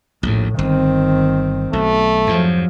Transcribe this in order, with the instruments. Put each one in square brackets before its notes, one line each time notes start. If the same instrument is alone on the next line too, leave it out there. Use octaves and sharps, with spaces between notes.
[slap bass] A#1 D#2 [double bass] A2
[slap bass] G1 [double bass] D#3 C4
[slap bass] B1 [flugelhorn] A3
[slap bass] F2 G#2 [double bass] F3 F#3